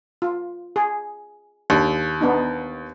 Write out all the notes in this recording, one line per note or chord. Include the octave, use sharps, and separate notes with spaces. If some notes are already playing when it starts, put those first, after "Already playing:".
F4
G#4
D#2 D4
B3 D4 D#4